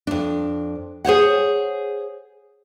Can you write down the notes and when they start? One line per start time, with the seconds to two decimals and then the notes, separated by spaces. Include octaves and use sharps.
0.07 F2 D4
1.05 G#4 C5 C#5 F#5